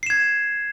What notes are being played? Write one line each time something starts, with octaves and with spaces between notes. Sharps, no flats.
G#6 C7 E7